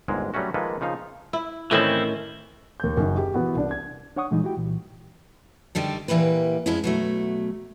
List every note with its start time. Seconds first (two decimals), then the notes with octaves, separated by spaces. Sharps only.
0.08 G1 D#2 G#2 G#3
0.34 F#3 G3 A3 C#4 F#4
0.54 D#3 F3 G#3 A#3 A4 B4
0.81 C#3 F3 D#4 F5
1.33 E4
1.71 A2 D#3 E3 C4 C#4 E4
2.80 D#2 G6
2.97 F#1 F#2 D#3
3.17 G4
3.34 E3 B3 E4 F#4
3.54 C2 D4
3.71 G#6
4.16 D4 C#5 F#5 C#6 D#6
4.31 A#2 E3 G3 G#3 D#4
4.44 E4 F#4 G4 G5
4.57 C2 A#2 E3
5.75 D3 D#3 G3 A4
6.08 A#2 E3 G3 A#3 B4
6.66 F2 F3 G#3 C#4 E4
6.84 B2 F#3 A3